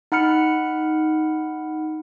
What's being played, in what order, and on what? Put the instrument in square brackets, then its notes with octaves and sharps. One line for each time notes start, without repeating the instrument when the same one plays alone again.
[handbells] D#4 F#5 B5 F6 C#7